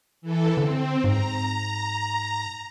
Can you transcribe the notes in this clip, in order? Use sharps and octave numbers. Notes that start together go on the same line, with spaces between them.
E3 A4
D3 C4
G#2 A#5